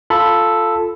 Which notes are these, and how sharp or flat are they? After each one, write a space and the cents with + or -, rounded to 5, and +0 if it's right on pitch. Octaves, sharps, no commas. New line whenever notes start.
F4 +0 A4 +0 B5 +0